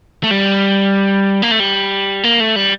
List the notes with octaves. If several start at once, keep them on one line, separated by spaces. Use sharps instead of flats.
A3
G3
A#3
A3
G3
A#3
A3
G3